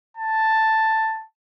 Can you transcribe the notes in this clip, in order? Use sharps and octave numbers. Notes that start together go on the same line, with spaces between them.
A5